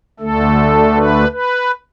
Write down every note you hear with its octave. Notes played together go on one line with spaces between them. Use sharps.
D2 D3 A3 A4
B4
B4